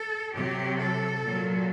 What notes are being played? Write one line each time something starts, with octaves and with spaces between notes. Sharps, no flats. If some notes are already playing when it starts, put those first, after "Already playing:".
Already playing: A4
C3 F#3 G4
A4
A#2 F#3